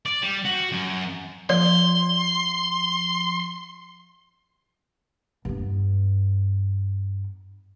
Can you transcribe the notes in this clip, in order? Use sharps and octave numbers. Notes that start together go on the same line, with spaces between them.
D5
G3
F#4
F#2
F3 D5 C6
G2 B3